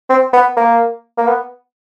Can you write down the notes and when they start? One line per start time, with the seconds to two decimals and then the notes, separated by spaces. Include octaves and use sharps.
0.09 C4
0.33 B3
0.57 A#3
1.18 A#3
1.27 B3